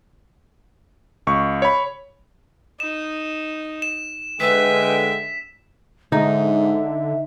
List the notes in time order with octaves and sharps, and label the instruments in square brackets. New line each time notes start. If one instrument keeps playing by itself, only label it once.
[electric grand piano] C#2 C#6
C#5 B5
[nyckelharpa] D#4 [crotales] E7
[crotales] E7
[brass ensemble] D3 G#3 G5 [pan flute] B4 [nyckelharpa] E5 [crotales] B6
[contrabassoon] G#2 [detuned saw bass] D3 [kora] D#4 [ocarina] E5